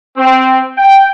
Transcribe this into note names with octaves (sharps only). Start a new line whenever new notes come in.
C4
G5